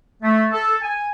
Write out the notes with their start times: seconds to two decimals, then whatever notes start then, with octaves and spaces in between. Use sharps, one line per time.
0.23 A3
0.51 A4
0.82 G#5